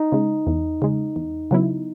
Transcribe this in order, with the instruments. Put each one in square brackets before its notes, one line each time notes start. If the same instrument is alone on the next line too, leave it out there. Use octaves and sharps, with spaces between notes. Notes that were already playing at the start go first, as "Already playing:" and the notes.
Already playing: [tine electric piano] D#4
[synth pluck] C#3 G#3
E2
C#3 G#3
E2
C#3 F#3 B3 E4